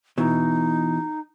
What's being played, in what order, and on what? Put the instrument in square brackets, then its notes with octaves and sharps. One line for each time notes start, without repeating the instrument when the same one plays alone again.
[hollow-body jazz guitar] B2 E3 [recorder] D#4